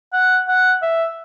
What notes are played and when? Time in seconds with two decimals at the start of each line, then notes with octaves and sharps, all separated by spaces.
0.13 F#5
0.48 F#5
0.82 E5